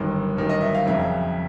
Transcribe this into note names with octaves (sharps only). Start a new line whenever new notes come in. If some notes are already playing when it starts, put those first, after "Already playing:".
Already playing: G1 F#2 D#3
G1 F#2 D#3
D#5
E5
F5
F#1 F2 C#3 E5